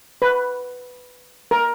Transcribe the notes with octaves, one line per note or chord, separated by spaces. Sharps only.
B4
A#4